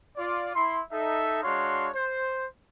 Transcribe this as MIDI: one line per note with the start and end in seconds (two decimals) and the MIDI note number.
0.16 0.51 65
0.16 0.51 74
0.54 0.80 64
0.54 0.80 84
0.91 1.40 63
0.91 1.40 69
0.91 1.40 76
1.42 1.87 56
1.42 1.87 62
1.42 1.87 66
1.42 1.87 73
1.42 1.87 77
1.42 1.87 84
1.93 2.44 72